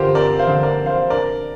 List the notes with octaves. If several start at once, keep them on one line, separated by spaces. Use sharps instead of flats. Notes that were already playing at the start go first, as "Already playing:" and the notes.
Already playing: D3 F4 G4 A#4 C5
C4 A#4 D5
C5 F5
D3
A#4 D5
C4
C5 F5
D4 A#4 D5